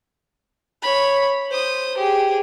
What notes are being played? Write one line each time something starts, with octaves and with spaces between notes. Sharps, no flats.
C#5 B5
C5 D#6
G4 G#4